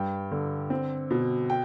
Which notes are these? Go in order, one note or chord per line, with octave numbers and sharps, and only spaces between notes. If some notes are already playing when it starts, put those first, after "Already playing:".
Already playing: G2 G5
D3
C4
B2
G5